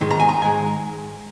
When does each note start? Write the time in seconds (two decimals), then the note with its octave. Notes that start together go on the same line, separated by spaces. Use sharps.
0.01 G#2 D#3 G#3
0.11 A#5
0.20 G#5
0.29 A#5
0.42 G#2 D#3 G#3 G#5